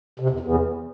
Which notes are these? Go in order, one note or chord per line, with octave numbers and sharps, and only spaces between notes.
C3
E2
E2